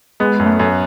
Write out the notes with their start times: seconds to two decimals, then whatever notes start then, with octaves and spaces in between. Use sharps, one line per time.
0.20 G#3 B3
0.40 F#2
0.46 A3
0.60 F#2